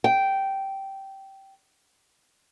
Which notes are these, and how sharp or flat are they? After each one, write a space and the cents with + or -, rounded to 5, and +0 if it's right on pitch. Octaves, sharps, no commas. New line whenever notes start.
G5 -10